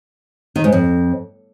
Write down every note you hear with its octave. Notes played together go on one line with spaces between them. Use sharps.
D#3
G#2
F2